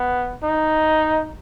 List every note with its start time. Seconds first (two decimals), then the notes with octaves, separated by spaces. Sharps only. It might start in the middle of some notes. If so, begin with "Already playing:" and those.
Already playing: B3
0.43 D#4